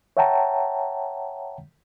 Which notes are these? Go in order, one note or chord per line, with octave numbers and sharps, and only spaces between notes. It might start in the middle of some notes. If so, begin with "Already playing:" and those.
C#5 E5 F#5 G5 A5 A#5